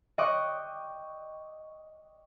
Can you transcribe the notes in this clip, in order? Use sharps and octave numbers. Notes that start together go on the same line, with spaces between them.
D#5 G5 C#6 D6 F#6